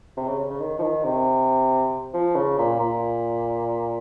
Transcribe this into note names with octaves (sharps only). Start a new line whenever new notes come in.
C3
C#3
C#3
C#3
D#3
F3
D#3
C3
F3
C#3
A#2
A#2